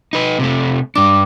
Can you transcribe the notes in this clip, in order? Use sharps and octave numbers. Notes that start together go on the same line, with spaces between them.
D#4 B4
C3 A3
G2 D4 D6